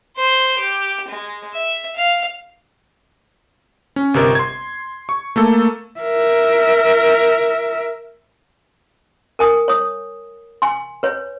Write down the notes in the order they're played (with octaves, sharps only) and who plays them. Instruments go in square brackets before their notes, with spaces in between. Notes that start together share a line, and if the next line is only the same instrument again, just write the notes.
[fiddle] C5 C6
G4
G#3
E5
F5
[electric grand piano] C#4
G1 C3 A#4 D#5
C6 G#6
C#6
A3 A#3 A4
[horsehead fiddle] A#4 E5
[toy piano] A#4 G#5 D#6
C#5 D#6
G#5 C6
B4 C#5